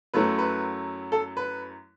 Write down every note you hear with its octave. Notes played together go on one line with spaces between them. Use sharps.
F#2 F#3 A3 E4 B4
B4
A4
B4